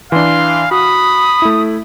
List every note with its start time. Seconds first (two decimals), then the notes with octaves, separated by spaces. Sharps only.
0.12 E3 D4 F5 C6
0.71 F#4 B5 D#6
1.42 A3 E4